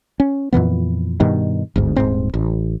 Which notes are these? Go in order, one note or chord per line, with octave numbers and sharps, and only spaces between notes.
C#4
F2 A#2 E3 B3
G2 B2 D#3
G1 D2 G#2
D#1 G#2 C4
A1